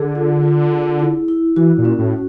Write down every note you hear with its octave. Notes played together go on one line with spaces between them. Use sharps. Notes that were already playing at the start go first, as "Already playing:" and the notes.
Already playing: D3 G#4
F4
F4
G#4
E4
E4
E3 F#4
A#2
C#4
A2